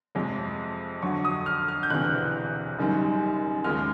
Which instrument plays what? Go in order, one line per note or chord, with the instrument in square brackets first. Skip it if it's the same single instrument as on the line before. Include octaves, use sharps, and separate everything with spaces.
[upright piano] F2 C3 F3 G#3
F2 D3 F#3 C#6
D#6
F6
F6
G6
E1 D2 C3 E3 F#6
F#1 F#2 D#3 G3
D#2 C#3 F3 G#3 F6